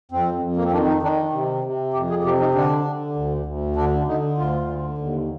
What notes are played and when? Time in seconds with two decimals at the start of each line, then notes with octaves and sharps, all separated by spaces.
0.11 F2 C4
0.42 F2
0.56 A#3
0.64 C4
0.72 D#3 D4
0.88 D#4
1.02 D#3 D4
1.33 C3
1.64 C3
1.93 F2 G4
2.10 G#4
2.24 C3 G4
2.40 D#4
2.55 D3 D4
2.85 D3
3.15 D2
3.46 D2
3.76 D3 D4
4.07 D3 D#4
4.38 D2 F4
4.67 D3
4.98 D#2